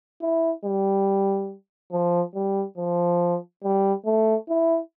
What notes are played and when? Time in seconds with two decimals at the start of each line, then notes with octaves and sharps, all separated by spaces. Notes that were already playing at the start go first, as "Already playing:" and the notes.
0.22 E4
0.65 G3
1.92 F3
2.35 G3
2.77 F3
3.64 G3
4.06 A3
4.49 E4